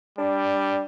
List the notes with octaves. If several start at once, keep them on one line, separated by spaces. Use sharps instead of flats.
G3 D4